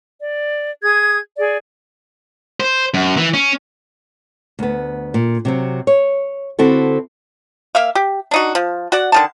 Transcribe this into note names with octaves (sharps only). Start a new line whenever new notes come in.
D5
G#4 D#6 G#6
G#4 D5
C5
F#2
E3
C#4
D2 B3
A#2
C3 F#3 C4
C#5
D3 C4 E4 F#4 A4
A#3 E5 F5
G4
D4 D#4 F#4
F3
F#4 D5 F#5
D3 D#3 A5